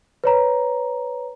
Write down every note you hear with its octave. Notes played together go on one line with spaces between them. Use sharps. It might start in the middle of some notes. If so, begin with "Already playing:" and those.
B4 C#5 A#5